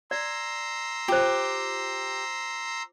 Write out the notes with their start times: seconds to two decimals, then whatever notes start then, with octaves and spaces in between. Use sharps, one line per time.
0.11 D5 A#5 C6 E6
1.08 F4 G4 C5